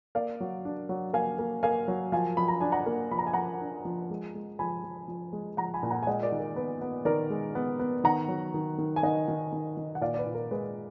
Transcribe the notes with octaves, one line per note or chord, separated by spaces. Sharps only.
A#3 D5 F5
F#3
D4
F#3
A#3 F5 G#5
A#3
A#3 F5 G#5
F#3
F3 F5 G#5
F3 B5
A#5
D4 G#5
F#5 A#5
A#3
F3 B5
A#5
G#5
F3 F#5 A#5
D4
F3
G#3
G#3
F3 G#5 B5
F3
F3
G#3
F3 F#5 A#5
G#5 B5
A#2
F#5 A#5
G#5
G#3 D#5 F#5
A#4 D5
D#3
A#4
B3 B4
B3
D#3 A#4 D5
G#3
B3
B3
D#3 F#5 A#5
F#3
D#3
D#3
G#5
D#3 D#5 F#5
D#3
D#3
D#3
F#5
A#2 D5 F5
D5
B4
A#2
A#4
G#3 B4